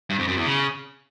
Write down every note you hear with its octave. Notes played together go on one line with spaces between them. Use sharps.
G2
F2
F#2
E2
C#3